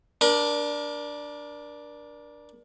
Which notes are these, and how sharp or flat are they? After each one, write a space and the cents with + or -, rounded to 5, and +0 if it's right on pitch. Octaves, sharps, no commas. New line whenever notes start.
D4 +0 A#4 +35